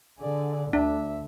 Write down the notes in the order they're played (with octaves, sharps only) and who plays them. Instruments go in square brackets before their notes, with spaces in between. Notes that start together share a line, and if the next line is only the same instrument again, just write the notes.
[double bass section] D3 [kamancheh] G#4 D5
[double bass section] D2 [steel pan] D4 [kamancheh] E5